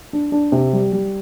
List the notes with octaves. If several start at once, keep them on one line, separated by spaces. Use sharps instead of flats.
D4
D4
C3
G3
G3